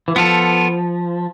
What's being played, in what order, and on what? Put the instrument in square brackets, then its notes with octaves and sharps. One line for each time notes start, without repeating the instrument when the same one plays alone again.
[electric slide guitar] E3
[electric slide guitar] F3 [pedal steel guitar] B3 F4 A4